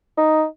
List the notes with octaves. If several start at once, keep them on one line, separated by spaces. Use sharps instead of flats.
D#4